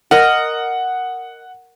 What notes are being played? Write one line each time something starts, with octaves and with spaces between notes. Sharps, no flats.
A#4 D#5 F#5